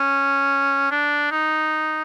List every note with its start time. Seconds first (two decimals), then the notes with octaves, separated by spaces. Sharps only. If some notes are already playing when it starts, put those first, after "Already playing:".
Already playing: C#4
0.91 D4
1.31 D#4